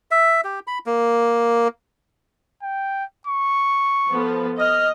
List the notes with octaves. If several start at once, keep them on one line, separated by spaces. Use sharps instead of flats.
E5
G4
B5
A#3
G5
C#6
F3 B3 A4
D#5 F6